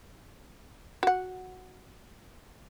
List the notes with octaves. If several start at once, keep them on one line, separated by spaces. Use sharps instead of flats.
F#4 F#5